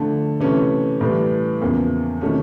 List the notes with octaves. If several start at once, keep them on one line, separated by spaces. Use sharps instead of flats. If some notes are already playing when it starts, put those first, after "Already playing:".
Already playing: D3 F3 A3
C3 E3 A3 C#4
A2 E3 G3
E2 C#3 F3 A#3
C3 D#3 F#3 A3 C#4